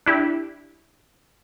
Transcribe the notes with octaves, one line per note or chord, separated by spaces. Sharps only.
D4 E4 G4